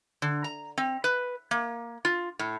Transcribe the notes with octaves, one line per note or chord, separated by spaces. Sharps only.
D3
A#5
C4
B4
A#3
F4
A2